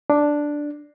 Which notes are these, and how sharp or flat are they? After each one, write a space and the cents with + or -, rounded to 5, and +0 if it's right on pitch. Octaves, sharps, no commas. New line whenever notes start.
D4 +0